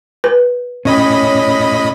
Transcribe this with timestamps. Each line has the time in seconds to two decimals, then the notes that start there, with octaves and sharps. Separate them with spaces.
0.24 B4
0.85 A2 C#4 G4 C#5 D#5 B5